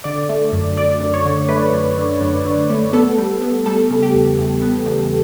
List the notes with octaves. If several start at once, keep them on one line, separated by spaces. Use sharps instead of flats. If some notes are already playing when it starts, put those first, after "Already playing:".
D3 D5
A3
F#2
F#2 D5
F#2
C#5
D3
A3 B4
F#2
D3
F#2
D3
A3
B3 A4
G3
B3
G3 A4
C#3
G4
E2
E2
B3
E2